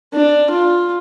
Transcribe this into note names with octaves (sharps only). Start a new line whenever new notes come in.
D4
F4